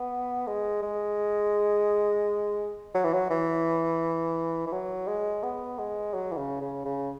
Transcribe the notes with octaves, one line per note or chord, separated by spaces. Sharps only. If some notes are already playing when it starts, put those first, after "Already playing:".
Already playing: B3
G#3
G#3
F#3
E3
F#3
E3
E3
F#3
G#3
B3
G#3
F#3
E3
C#3
C#3
C#3